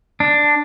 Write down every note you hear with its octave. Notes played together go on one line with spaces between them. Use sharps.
D4